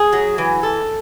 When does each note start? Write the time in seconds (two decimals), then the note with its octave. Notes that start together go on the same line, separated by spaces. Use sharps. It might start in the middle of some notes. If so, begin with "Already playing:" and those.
Already playing: G#4
0.13 F#3
0.38 E3
0.63 A4